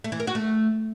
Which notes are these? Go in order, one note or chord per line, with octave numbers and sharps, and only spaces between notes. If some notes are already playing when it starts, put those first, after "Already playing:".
A3
E3
A#4
F#4
A3